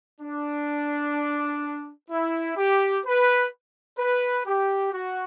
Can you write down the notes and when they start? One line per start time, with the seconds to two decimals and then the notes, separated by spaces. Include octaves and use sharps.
0.21 D4
2.10 E4
2.57 G4
3.05 B4
3.98 B4
4.46 G4
4.93 F#4